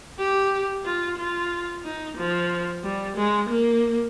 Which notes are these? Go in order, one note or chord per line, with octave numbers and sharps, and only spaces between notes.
G4
F4
F4
D#4
F3
G3
G#3
A#3